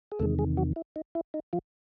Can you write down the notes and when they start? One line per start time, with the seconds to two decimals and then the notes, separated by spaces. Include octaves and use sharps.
0.12 G#4
0.19 E2 C3 D#3 G#3 A3 A4
0.39 G#3 G#4
0.57 F#3 F#4
0.76 E4
0.96 D#4
1.15 E4
1.34 D#4
1.53 F3 F4